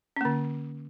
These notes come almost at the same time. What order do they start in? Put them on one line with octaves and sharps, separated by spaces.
C#4 A#3 D3